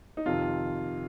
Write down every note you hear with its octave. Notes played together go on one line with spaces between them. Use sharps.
D#4
F2 C3 D#3 F4